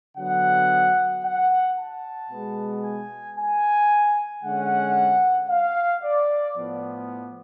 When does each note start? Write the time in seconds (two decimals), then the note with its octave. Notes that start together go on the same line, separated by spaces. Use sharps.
0.18 D3 F#3 B3 F#5
1.24 F#5
1.77 A5
2.31 B2 G#3 B3
2.84 G#5
3.37 G#5
4.43 D3 G#3 C#4 F#5
5.49 F5
6.04 D5
6.56 A2 F3 B3